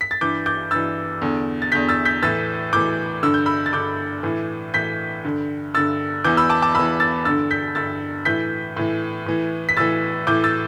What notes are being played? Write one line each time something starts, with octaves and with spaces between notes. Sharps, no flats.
B6
A6
G2 E3 D6 G6
D6 G6
G2 E3 E6 A6
E2 D3
A6
E2 D3 G6 B6
E6 A6
G6 B6
A2 E3 E6 A6
A2 E3 D6 G6
G2 D3 E6
G6
B5 E6
A6
G2 D3 D6 G6
A2 E3
A2 E3 G6 B6
G2 D3
G2 D3 E6 A6
E2 E3 D6 G6
B5 E6
A5 D6
A5 D6
E2 E3 B5 E6
E6 A6
G2 D3 E6 A6
G6 B6
G2 D3 E6 A6
A2 E3 G6 B6
A2 E3
A2 E3
B6
A2 E3 E6 A6
A2 E3 D6 G6
E6 A6